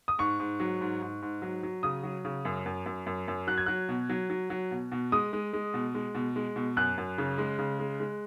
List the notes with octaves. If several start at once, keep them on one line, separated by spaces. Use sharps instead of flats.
D#6
G#2 C#6
G#2
F#3
G#2
G#2
G#2
F#3
F#3
C#3 D#6
F#3
C#3
F#2
F#2
F#2
F#2
F#2
F#3 F#6
G#6
F#3 F#6
B2
F#3
F#3
F#3
B2
B2
G#3 D#6
G#3
G#3
B2
G#3
B2
G#3
B2
F#2 F#6
F#2
C#3
G#3
C#3
G#3
G#3